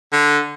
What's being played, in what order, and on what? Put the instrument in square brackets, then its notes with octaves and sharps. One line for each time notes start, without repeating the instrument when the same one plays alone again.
[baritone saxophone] D3